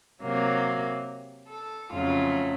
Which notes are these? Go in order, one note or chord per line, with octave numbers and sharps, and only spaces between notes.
C3 F#3 A#3
A4
F2 C#3 F#3 A3 F4